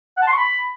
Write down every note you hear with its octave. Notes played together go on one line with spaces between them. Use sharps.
F#5
A5
C6
C#6
B5